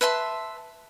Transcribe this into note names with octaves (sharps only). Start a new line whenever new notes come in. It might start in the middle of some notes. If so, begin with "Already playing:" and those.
B4 E5 A5 C6